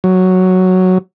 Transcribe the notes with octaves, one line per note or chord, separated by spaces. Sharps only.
F#3